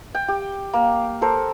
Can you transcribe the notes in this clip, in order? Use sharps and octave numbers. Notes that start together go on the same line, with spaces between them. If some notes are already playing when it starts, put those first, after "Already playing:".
G5
G4
A#3
A4 A#4 C5